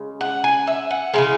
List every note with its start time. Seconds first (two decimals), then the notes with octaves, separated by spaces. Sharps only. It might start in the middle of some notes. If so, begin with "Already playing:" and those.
Already playing: C#3 G#3
0.21 F#5
0.44 G#5
0.67 E5
0.91 F#5
1.13 C#3 E3 G#3 G#5